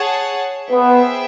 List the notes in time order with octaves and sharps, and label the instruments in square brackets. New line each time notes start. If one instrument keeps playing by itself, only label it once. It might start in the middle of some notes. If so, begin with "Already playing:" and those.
Already playing: [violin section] G#4 C#5 F#5 A5
[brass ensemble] B3 [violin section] G#4 C5 E5 G5